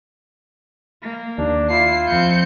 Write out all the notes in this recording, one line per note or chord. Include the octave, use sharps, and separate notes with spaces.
A#3
D#2 D4
E4 F4 C7
F2 C4 G6 C#7